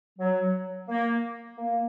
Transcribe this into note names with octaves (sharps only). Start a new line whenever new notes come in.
F#3
A#3
A#3